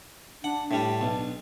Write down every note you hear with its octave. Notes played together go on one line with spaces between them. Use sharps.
D4 F#5
A2 G3 D4
B1